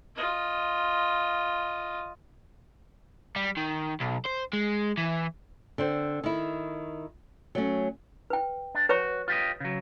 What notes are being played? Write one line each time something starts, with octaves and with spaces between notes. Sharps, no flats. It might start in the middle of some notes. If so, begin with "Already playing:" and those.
F4 D#5
G3
D#3
B1
C5
G#3
E3
D3 C4 C5
D#3 E4
F#3 A3 C#4
B4 G5
D4
F#4 B4 C#5 C#6
F4 G4 D#5
C#3 F#3